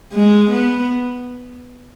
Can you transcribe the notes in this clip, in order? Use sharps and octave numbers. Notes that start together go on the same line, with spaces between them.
G#3
B3